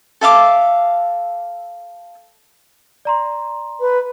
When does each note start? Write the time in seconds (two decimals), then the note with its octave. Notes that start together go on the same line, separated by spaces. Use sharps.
0.21 A4 E5 F5 D6
3.05 D5 A#5 C6
3.80 B4